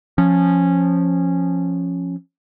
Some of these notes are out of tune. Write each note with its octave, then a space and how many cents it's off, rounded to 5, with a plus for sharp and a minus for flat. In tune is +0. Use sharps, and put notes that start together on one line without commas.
F3 +0 C#4 -10